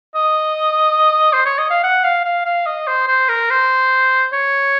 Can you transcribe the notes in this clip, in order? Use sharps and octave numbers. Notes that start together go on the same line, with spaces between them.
D#5
C5
C#5
D#5
F5
F#5
F5
F5
F5
D#5
C5
C5
A#4
C5
C#5